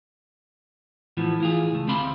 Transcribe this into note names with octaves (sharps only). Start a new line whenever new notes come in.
A2 E3 F3 B3
E3 F4 G#4
C#2 A3
D2 C3 C4 F5 B5 C6